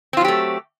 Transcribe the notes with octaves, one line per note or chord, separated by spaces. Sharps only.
F#3 A3 C4 F4 G4